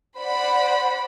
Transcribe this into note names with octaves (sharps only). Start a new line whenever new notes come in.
C5 D5 F#5 B5